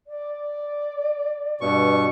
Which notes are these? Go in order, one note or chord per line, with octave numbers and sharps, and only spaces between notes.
D5
G2 B2 C#6